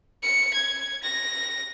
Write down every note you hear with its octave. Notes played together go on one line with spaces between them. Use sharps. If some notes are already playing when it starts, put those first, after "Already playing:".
C#7
G#6
A#6